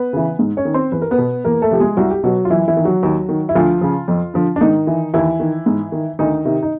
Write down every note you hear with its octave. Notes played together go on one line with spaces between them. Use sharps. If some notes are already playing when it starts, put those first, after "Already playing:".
Already playing: B3 B4
C#3 E3
G#2
C#4 C#5
D#3
C4 C5
E2 B4
A#4
B3 B4
B2
E2 A#3 A#4
A3 A4
C3 F3 G4
G#3 G#4
C2 F#4
G4
B2 F#3 F#4
F4
F#2 E3 E4
E3 E4
D#3
F#3 F#4
D#2
D#3
E4
D2 F3 F4
C#3 F3
F2
D3 F3
D4
G#2 D#3 D#4
E3
D#2 E3 E4
D#3
G#2
D#3
D2 D#3 D#4
C3 D#3
D#4